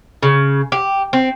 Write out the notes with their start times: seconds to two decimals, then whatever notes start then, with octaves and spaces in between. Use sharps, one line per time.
0.23 C#3
0.72 G4
1.13 C4